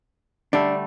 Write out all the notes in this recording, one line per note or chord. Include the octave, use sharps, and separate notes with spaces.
D3 G3 A3 D4